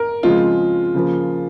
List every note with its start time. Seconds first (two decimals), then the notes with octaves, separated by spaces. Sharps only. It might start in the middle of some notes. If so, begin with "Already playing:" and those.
Already playing: A#4
0.23 C#3 F3 G#3 C4 F4
0.95 C#3 F3 A#3